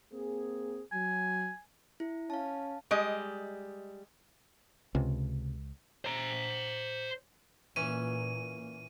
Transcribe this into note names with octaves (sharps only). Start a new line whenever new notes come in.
A#3 C4 G#4
F#3 G#5
E4
C#4 F5 A5
G3 G#3 D#5
C#2 C3
C5 A#5
A#2 E3 A#3 C#4 D#7